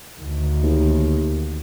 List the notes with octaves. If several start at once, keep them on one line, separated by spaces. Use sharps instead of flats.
D2 D#3
D#2